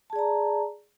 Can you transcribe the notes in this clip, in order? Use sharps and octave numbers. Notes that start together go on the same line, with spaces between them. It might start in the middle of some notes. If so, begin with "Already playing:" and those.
G#4 D5 A5 A#5